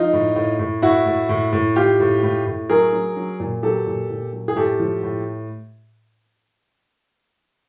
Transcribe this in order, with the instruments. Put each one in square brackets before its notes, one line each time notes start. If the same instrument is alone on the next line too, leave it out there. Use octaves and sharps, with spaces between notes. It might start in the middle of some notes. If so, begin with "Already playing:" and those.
Already playing: [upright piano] F3 D#4 F4
A2
A2
A2
A2 E4 F#4
A2
A2
A2
A2 F4 G4
A2
A2
A2
F#3 G#4 A#4
F#3
F#3
A#2
F#3 G4 A4
A#2
A#2
F#3
G#4
A2 G4 A4
F3
A2